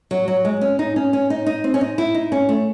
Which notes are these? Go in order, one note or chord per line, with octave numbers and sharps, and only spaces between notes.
F#3
F#3
G#3
C#4
D#4
C#4
C#4
D#4
D#4
C4
C#4
D#4
E4
D#4
C#4
A3